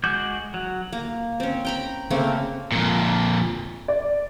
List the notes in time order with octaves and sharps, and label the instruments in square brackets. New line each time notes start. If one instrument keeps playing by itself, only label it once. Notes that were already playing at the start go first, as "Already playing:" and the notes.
[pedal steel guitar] G#3 F#4 D6 G6
F#3
[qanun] A#3
C4 C#4
G5 A#5 B5
C#3 A3 A#3 C4
[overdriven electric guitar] F2 A#2
[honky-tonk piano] D5